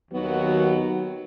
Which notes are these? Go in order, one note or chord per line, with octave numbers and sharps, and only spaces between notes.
D#2 D#3 F#3 B3 F#4